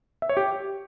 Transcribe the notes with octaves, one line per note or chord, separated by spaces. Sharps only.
E5
C#5
G4